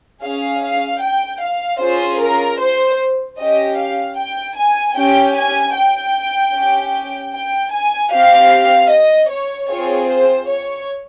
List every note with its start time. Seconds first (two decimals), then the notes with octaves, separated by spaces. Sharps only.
0.23 C#4 G#4 F5
0.63 F5
1.02 G5
1.42 F5
1.81 C#4 F4 G#4 C5
2.20 A#4
2.60 C5
3.39 C#4 G4 D#5
3.78 F5
4.18 G5
4.57 G#5
4.97 C#4 G4 G5
5.36 G#5
5.75 G5
6.54 C#4 G4
7.34 G5
7.73 G#5
8.13 C4 G4 F5
8.92 D#5
9.31 C#5
9.70 C4 F4 G#4 C#5
10.10 C5
10.49 C#5